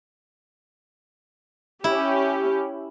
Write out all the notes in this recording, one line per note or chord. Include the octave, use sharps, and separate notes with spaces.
C#4 E4 G4